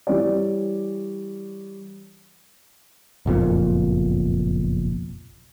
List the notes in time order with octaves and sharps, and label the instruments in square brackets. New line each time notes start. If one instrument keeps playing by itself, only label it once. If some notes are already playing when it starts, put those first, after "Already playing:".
[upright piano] E3 G3 C#5 D5
[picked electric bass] F#1 B1 F2 A#2